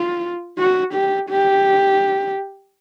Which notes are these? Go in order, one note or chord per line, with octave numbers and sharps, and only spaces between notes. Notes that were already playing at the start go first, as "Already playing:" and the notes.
Already playing: F4
F#4
G4
G4